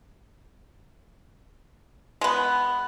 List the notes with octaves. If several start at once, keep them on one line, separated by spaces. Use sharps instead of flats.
G#3 B3